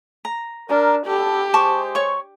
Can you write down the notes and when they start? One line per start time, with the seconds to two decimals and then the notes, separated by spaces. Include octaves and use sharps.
0.25 A#5
0.69 D4 A#4
1.06 B3 G4 A4
1.54 G#3 C5 A5 C#6 D6
1.95 C#5 C#6